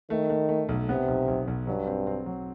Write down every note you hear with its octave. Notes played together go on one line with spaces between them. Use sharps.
D#3 A3
A3
A3
B1
C3 B3
B1
B1
B1
G2 F#3
C4
C4
F#3